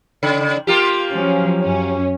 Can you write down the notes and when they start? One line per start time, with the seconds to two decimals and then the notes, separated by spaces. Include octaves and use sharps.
0.23 C#3
0.67 A#3 F4 G4
1.12 F3 F#3 C#4
1.61 F#2 C#4